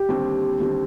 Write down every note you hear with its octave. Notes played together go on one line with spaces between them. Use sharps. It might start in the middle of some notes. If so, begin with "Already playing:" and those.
Already playing: G4
D#2 D3 G3 C4
D#2 D3 G3 C4